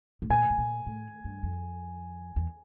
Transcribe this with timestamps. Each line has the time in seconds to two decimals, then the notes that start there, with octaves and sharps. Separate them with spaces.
0.22 A2
0.30 A#2 G#5
0.50 A2
0.58 A#2
0.86 A2
1.24 G2
1.43 F2
2.36 E2